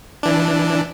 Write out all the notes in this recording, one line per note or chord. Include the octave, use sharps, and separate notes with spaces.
E3 D4